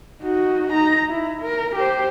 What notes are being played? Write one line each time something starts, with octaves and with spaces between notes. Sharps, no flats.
D#4 F#4
D#4 A#5
E4
A#4
G4 C5